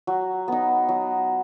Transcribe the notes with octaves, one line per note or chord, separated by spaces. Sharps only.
F#3
B3 D#4
F#3